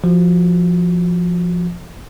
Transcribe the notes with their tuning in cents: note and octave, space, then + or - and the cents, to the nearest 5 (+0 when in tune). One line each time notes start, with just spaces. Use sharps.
F3 +0 F#4 +0